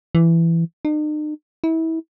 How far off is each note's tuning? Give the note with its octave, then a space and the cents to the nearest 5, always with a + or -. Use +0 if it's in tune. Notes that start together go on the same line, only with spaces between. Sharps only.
E3 +15
D#4 -45
E4 -30